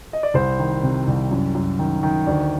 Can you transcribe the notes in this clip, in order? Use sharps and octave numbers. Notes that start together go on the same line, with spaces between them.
D#5
D5
C2 C5
D#3
C3
C2
F#2
F#2
D#3
D#3
D2 D5